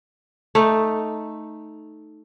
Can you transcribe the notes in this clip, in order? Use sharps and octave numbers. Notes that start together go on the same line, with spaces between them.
A3 D#4